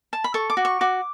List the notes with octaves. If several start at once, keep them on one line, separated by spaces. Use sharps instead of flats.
A5
B5
A4 C#6
D6
F#4
C#6
F#4 D6